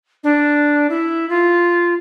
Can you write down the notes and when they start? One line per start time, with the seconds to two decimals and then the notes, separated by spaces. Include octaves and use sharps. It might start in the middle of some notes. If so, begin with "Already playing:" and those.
0.23 D4
0.89 E4
1.29 F4